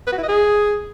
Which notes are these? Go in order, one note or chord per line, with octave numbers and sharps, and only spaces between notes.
B4
F#4
E4
D#5
G#4